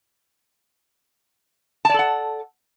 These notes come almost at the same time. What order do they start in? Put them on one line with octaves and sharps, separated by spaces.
A5 D5 A4 F#5